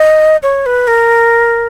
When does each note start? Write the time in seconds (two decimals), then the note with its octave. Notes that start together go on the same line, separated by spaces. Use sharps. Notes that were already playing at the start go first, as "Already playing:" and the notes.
Already playing: D#5
0.43 C#5
0.66 B4
0.87 A#4